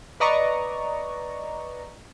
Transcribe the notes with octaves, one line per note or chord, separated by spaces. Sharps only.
B4 D5 D#5 A#5 C#6